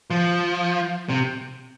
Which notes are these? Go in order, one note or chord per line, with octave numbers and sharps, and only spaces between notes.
F3
C3